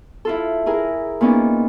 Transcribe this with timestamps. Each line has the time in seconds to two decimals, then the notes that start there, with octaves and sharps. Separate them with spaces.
0.25 E4 F4 A4
0.66 E4 G#4 A#4
1.21 A#2 B3 C#4 D#4